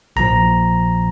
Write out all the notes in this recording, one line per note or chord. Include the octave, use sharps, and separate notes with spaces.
A#1 A#2 F3 A#5